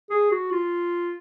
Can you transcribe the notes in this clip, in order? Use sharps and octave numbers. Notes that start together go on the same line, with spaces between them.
G#4
F#4
F4